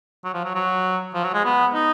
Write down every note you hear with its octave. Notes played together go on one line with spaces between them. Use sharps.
F#3
F3
F#3
F#3
F3
F#3
G#3
B3
D#4